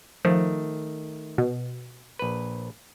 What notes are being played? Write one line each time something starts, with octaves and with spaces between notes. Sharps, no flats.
D#3 F3 A3
B2
A#1 B4